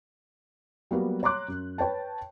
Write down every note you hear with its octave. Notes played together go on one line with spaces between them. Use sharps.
F#3 G3 A#3 B3 F#4
C#5 A#5 C6 D6 F#6
F#2
B4 C#5 G5 A5